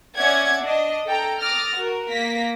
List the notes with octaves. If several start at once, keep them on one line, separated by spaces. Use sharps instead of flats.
C#4 D5 E5 F#5 G#6
D4 D#5
A4 G5 A#5
D6 D#6 F6 A6 A#6
F#4 A#4
A#3 A#6 B6